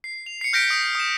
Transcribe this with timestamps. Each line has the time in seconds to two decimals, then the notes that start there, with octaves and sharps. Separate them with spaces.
0.04 C7
0.26 F7
0.41 C7 C#7
0.53 F6 G6 A#6 B6 D7
0.70 D#6
0.95 D#6 E7